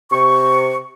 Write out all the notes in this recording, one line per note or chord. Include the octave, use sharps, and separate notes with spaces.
C3 C#6